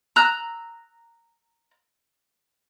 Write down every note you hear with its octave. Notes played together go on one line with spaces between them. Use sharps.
A#5 E6 F#6